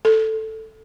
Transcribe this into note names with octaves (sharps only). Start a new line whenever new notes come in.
A4